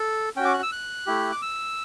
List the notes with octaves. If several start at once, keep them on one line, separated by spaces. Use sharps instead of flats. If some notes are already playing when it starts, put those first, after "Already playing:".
Already playing: A4
C#4 F#4 G5
D6
F#6
E6
F#6
A3 E4 G4
D6
E6